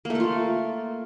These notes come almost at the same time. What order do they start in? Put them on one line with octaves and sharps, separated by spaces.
A#3 A3 A4 F4